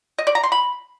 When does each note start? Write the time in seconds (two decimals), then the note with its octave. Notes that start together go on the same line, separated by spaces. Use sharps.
0.18 D#5
0.27 D5
0.35 A#5
0.43 C6
0.52 B5